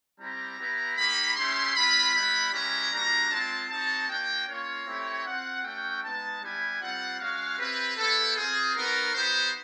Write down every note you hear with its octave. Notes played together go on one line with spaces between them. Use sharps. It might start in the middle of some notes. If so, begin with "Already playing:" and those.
G3 C4 E4 G4 A#5
B3 E4 G4
A#3 D#4 G4 B5
A3 C#4 E4 G4 C6
G#3 C4 F4 B5
G3 B3 E4 B5
G#3 C#4 E4 G4 A#5
G3 A#3 D4 F#4 A#5
G#3 C4 F4 A5
C4 D#4 F#4 A5
A#3 D4 F#4 G5
A#3 C#4 F4 C#5
A3 C4 E4 G4
C4 F4 F#5
A3 C#4 F#4 G5
G#3 B3 D#4 A5
G3 B3 E4 G4 G#5
G3 C4 F4 F#5
G#3 C#4 F#4 F5
C4 E4 G4 B4
B3 E4 G4 A4
C4 F4 G#4
B3 D#4 F#4 A#4
B3 D#4 G4 C5